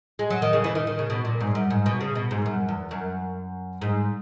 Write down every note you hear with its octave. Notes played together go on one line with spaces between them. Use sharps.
G#3
F#3
D#3
C#3
E3
D#3
D#3
C#3
B2
A#2
G#2
F#2
G#2
B2
C#3
B2
G#2
F#2
E2
F#2
G#2